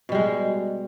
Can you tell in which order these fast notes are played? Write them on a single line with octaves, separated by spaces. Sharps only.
B2 G3 G#3